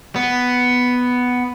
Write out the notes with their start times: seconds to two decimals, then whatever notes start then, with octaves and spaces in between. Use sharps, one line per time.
0.16 B3